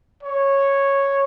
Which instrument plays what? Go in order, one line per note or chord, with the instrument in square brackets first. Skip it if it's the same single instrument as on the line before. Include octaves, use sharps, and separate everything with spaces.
[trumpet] C#5